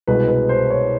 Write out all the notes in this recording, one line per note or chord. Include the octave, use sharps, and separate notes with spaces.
C2 B2 G#3 B4
B4
C5
C#5